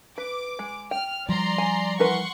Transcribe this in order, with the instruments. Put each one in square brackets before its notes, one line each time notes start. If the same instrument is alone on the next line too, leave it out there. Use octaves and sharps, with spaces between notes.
[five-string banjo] B4 [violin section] D6
[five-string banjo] G#3
[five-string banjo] G5 [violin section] F6
[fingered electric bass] F3 G3 [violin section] D5 A#5 C6
[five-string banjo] G#5
[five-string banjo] E3 A#4 B4 [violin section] F#5 C6 C#6